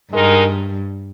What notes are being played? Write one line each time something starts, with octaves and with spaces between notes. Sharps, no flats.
G2 D#3 G#3 D#4 A#4